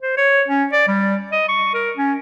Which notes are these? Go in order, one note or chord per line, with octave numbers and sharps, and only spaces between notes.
C5
C#5
C#4
D5
G3
D#5
C#6
A#4
C#4